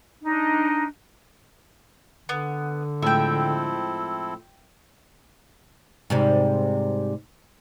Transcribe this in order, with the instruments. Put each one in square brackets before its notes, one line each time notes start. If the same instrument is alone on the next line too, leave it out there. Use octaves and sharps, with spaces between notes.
[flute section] D4 D#4
[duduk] D3 [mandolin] B3
[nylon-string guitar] A2 F3 G#3 [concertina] C4 E4 A4 [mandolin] E5 G5
[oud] G#2 C3 G3